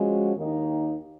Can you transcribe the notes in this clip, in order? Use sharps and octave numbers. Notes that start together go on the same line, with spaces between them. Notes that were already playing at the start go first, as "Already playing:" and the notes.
Already playing: F3 G#3 C#4 F#4
D#2 D#3 A#3 D#4